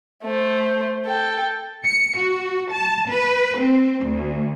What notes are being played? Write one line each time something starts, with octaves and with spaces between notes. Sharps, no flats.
A3 C5
A4 G5
C#7
F#4
A5
B4
C4
D2